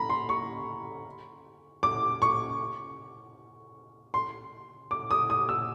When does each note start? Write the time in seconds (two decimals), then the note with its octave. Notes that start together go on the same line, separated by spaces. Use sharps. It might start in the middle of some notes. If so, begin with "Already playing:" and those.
Already playing: A#5 B5
0.10 C6
0.29 C#6
1.83 D6
2.22 C#6
4.14 C6
4.91 D6
5.11 D#6
5.30 D#6
5.49 E6